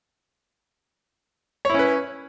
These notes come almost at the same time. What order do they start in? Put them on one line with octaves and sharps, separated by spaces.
C#5 E4 C#4 B4